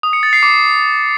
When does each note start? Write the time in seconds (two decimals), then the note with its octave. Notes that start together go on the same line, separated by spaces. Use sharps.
0.03 D#6
0.13 C#7
0.23 A6
0.33 C7
0.43 D6